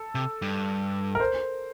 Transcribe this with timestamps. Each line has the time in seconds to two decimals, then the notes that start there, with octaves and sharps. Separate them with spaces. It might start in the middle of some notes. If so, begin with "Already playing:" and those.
Already playing: A4
0.15 C3
0.42 G2
1.15 A#4
1.20 C5